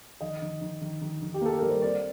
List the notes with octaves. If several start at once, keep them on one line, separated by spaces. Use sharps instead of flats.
D#3 D#5
D#3
D#3
D#3
D#3
D#3
G4
A#3 A4
G3 A#4
C5
C4 D5